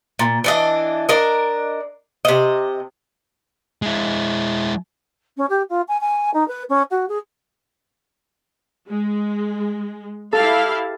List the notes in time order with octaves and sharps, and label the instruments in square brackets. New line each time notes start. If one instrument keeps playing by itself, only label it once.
[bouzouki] A#2
E3 D4 D#5
D4 A#4 D#5
C3 D#5
[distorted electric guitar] G#3 E4
[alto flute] C#4
G4
F4
G#5
G#5
D#4
B4
C#4
F#4
G#4
[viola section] G#3
[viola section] E4 G4 F5 [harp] A4